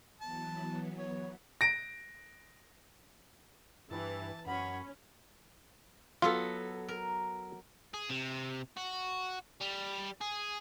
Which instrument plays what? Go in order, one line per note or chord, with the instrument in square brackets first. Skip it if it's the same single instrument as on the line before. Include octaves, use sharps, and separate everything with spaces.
[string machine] E3 F#3 B3 [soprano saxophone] A5
[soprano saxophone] C#5
[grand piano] A#6 D7
[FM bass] G2 [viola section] E3 [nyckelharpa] A5
[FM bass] F#2 [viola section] C#4 [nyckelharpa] C#5 B5 [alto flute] F#5
[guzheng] F#3 B3 A4 [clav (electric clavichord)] F4
[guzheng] A#4
[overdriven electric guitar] G#4
C3
F#4
G3
G#4